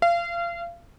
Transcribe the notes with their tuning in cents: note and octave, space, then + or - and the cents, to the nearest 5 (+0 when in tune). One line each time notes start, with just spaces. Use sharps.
F5 -30